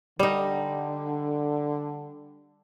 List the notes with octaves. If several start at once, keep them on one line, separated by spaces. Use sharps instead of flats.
D3 G3 D#4